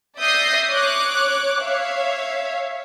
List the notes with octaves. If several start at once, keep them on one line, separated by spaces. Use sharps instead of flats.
D5 E5 D#6 G6 A#6 C7
C#5 D6 F#6
C#5 E5 F5